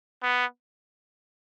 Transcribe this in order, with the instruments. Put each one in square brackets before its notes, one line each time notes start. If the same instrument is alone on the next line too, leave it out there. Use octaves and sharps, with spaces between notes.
[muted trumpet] B3